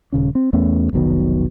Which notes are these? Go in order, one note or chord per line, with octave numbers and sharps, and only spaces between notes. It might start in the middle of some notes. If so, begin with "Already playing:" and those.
D#1 C#3 C#4
C4
E2 A3 B3 C#4
F1 B1 B2 D#3